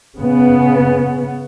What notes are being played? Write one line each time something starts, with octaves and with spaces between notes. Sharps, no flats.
C#3 B3